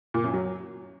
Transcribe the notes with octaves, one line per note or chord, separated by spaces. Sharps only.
A#2
F#2
F#3